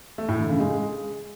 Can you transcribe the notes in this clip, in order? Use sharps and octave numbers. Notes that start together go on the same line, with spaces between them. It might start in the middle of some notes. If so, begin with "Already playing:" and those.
A3
A2
D3
C#3
G#3